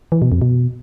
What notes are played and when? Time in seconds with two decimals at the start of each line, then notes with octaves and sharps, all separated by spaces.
0.12 E3
0.22 B2
0.32 F2
0.42 B2